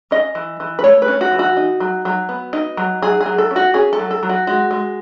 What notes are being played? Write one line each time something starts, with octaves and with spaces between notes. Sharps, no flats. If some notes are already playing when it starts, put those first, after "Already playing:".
C#4 D#5
E3
E3
B4
A3 C#5
B4
C#4
F#4
E3
F#4
D#4
F#3
F#3
B3
D#4
F#3
F#3 G#4
G#4
F#3
A4
C#4
F#4
C#4 G#4
A4
F#3
A4
F#3
F#4
G#3 F#4
G#3